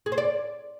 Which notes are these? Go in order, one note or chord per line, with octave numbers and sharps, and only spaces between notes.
G#4
C5
D5